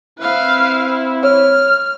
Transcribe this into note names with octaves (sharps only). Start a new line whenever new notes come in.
C4 E4 B4 F5
C#5 F6